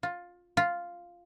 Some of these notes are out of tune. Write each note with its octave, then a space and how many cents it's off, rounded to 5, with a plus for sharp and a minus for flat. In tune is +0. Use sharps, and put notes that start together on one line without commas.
F4 +15
F4 +0